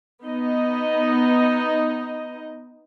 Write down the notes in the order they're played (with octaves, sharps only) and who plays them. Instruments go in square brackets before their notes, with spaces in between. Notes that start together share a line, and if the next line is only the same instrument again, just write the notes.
[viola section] B3 D#4 D#5